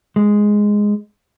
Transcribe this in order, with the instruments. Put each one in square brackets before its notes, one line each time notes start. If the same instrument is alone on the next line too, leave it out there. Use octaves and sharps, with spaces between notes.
[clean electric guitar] G#3